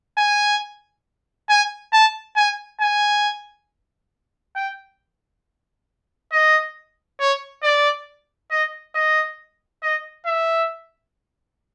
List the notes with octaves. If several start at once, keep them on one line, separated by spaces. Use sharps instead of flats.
G#5
G#5
A5
G#5
G#5
G5
D#5
C#5
D5
D#5
D#5
D#5
E5